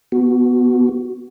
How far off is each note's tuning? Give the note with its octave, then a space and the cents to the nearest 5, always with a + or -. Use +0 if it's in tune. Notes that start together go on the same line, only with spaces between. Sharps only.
B3 +0 F#4 +0